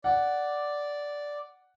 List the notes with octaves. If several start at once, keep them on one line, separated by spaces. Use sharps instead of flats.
D5 F#5